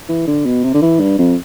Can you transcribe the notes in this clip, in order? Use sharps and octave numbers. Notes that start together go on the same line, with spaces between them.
E3
D3
B2
C3
D3
E3
G2
F2